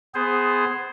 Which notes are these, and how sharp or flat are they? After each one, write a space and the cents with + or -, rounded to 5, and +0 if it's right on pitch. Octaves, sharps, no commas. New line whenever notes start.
B3 +25 G#4 +0 C5 +0